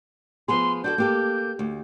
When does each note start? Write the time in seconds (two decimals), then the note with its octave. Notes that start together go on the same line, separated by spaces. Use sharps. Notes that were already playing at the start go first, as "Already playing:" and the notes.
0.48 F3 B3 G#4 C6
0.84 D4 F#4 A4 G6
0.98 A#3 G4 A4
1.59 D2